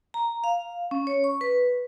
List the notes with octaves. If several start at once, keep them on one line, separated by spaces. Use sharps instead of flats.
A#5
F5
C#4
C#5
C#6
B4